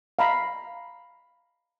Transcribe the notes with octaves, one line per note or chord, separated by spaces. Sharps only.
F5 A#5 B5